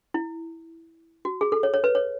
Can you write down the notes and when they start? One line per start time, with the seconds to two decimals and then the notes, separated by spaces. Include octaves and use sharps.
0.14 E4
1.25 F#4
1.41 G#4
1.52 A4
1.63 C#5
1.74 C#5
1.84 B4
1.95 C#5